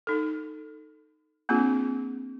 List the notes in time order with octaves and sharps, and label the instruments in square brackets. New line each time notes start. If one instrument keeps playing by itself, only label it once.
[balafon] D#4 A4
A#3 C4 D4 F4 G#4